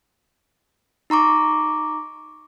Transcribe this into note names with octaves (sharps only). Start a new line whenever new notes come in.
D#4 A#5 C#6 D6